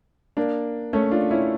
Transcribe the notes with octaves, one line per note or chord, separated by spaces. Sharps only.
A#3 D4
A3 C#4
D4 F4
C#4 E4